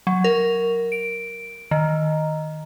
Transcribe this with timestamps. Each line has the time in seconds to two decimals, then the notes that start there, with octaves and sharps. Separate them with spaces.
0.07 F#3
0.24 A#4
0.92 D7
1.71 D#3